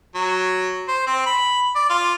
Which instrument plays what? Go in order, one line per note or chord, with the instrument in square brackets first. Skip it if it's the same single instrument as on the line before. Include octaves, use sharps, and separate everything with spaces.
[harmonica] F#3
C5
C4
B5
D5
F4